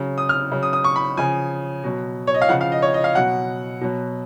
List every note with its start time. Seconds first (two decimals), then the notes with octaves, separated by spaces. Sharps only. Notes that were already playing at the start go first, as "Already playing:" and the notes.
Already playing: C#3 F#3
0.18 D#6
0.29 F6
0.52 C#3 F#3
0.63 D#6
0.73 D#6
0.84 C#6
0.96 B5
1.17 C#3 F3 G#5
1.84 B2 F#3
2.27 C#5
2.34 D#5
2.42 F5
2.49 C#3 F3 F#5
2.61 F5
2.72 D#5
2.82 C#5
2.94 D#5
3.04 F5
3.15 B2 F#3 F#5
3.81 B2 F#3